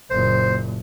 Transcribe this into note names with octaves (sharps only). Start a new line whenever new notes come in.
F#1 A#2 C5